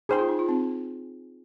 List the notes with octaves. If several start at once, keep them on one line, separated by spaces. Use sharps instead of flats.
D#4 G#4 C5 G5 C6
F4
D#4
F4
C4 D#4